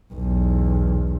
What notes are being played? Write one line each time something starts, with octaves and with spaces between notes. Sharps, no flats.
B1 E2